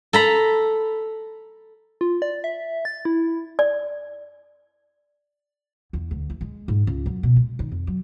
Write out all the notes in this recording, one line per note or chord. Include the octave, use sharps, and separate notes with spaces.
A4 A#5 B5
F4
D5
E5
A6
E4
D5
E2
D2
E3
G#3
G#2
C#2
F#2
B2
G#3
D#3
F2
F#3